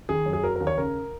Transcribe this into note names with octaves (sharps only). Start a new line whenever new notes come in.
D#3 G#4
F#2
G#4
F#3 A#4
D#2 A#4
C#5
C#3 A#4